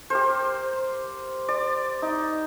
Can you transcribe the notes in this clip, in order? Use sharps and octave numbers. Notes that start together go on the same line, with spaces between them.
G4 A#4 C5
D5
D#4